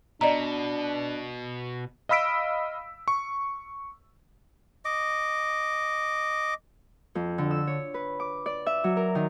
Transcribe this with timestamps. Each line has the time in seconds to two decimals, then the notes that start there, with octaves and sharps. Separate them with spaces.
0.21 B2 D4 D5 D#5 A#5
2.09 D#5 F5 B5 E6 B6 D7
3.08 C#6
4.85 D#5 D6
7.15 F2
7.38 D3
7.51 E6
7.67 C#5
7.94 B4
8.20 D6
8.46 D5
8.66 E5
8.84 F#3
8.97 A#4
9.15 D#3